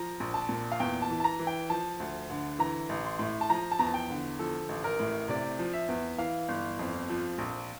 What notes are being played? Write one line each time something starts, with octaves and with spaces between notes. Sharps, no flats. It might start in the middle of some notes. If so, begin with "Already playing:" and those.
Already playing: F3 A#5
A#1
A5
A#2
F5
E2 G5
A5
E3
A5
A#5
E3
G5
F3 A5
D2
D3
E3 A#5
A1
C6
A2
A5
F3 A#5
A5
E2 A#5
A5
G5
D3
F3 A4
A1
A#4
A2
C3 D5
F3
E5
E2
E3 F5
G1
F2
F3
A#1